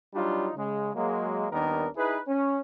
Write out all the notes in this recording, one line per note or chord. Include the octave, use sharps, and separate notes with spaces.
F#3 G3 D4 D#4 F4
C#3 G#3
F#3 G#3 A#3
D#2 D#3 G3 B3 D4 A#4
D#4 E4 G#4 B4
C#4